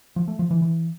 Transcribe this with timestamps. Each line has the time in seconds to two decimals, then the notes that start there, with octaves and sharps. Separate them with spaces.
0.16 F3
0.28 A3
0.39 F3
0.51 E3
0.62 E3